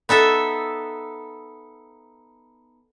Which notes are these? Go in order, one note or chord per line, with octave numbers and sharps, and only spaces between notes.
B3 D#4 A4 E5